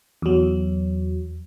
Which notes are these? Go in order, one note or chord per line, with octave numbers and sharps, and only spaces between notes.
E2 F#3